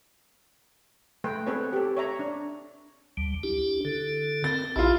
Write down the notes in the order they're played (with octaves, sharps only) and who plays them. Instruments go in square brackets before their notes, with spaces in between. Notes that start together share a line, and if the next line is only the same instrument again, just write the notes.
[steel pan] G#3 A3 B4 G5
B3 C4 G#4 A4 B4 C#5
G4 A4
C#5 E5 A#5
D4
[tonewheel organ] D2 G3
D4 E4 G4
D3 A4
[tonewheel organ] C4 A#4 [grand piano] A6
[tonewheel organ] A#1 G4 A5 [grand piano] E4 F4